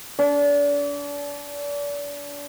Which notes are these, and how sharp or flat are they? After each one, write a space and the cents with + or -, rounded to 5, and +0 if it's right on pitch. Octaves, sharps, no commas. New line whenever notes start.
D4 -35